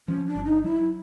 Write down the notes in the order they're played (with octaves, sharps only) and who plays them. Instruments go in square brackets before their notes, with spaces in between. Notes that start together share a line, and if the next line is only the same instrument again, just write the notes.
[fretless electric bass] F3 [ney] C#4
[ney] D4
[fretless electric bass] G1
[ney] D#4
[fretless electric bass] F#3 [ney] E4